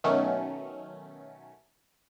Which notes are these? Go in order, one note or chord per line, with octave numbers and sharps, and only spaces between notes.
B2 D#3 F#3 A3 C#4